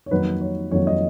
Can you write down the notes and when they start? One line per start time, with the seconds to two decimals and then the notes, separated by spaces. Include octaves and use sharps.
0.06 C#5
0.11 F2 D#3 F#3 A#3 B4
0.41 C#5
0.71 F2 D#3 F#3 A#3 C#5
0.87 D#5